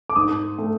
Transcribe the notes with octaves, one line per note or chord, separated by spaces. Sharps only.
D6
G#2 D#6
A3